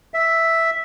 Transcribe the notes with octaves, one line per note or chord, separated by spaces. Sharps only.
E5